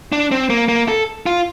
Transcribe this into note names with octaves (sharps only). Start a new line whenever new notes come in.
D4
C4
A#3
A#3
A4
F4